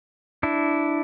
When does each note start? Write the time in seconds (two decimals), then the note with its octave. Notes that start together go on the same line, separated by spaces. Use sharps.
0.43 D4 E4